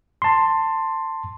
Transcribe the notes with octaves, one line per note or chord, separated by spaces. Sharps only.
A5 C6